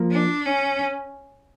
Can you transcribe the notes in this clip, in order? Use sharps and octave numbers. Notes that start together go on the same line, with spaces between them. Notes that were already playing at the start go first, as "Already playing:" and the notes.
Already playing: F3 A#3
D4
C#4